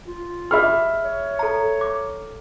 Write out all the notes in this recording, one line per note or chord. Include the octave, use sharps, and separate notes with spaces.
F4
G4 G#4 D#5 E5 B5 F6
C#5
A4 A#5
D6